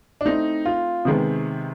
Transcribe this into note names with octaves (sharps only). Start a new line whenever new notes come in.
D4
A3 C4 D#4 E4
F4
C3 D#3 G#3 B3